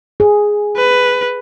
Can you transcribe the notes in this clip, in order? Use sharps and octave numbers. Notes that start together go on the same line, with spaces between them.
G#4
B4